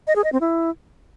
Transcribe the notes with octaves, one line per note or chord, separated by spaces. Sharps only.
D#5
G#4
D#5
C4
E4